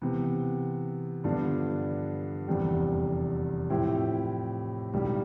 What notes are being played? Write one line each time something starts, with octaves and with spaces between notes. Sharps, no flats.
C3 E3 B3
G2 D3 F3 B3 D4
F1 E2 C3 G3
A2 F3 C4 E4 G4
B1 A2 G3